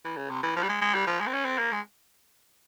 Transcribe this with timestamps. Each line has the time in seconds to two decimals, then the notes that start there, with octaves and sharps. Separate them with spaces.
0.05 E3
0.16 C#3
0.30 C3
0.43 E3
0.56 F3
0.63 G3
0.69 G#3
0.81 G#3
0.94 G3
1.07 F3
1.20 G#3
1.27 C4
1.33 C#4
1.45 C4
1.58 A#3
1.72 G#3